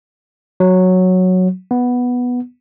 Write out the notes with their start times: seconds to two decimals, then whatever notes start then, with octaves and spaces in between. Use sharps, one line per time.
0.60 F#3
1.71 B3